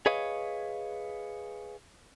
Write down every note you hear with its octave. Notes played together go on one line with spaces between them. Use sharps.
G#4 B4 C#5 D#5 F5